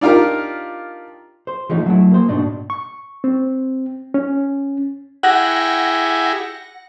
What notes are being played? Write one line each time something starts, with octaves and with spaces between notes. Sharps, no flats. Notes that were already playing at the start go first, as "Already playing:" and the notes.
D4 D#4 F4 G4 A#4
C5
E3 F3 G#3 A3 C#4 D#4
F#3 A3 E4
A#3 C5
G#2 B2 D4 D#4
C#6
C4
C#4
E4 G4 G#4 F#5 A#6